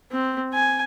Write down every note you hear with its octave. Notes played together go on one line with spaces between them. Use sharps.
C4
G#5